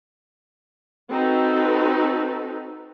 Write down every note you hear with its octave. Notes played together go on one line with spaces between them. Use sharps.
C4 D#4 F#4 A4 B4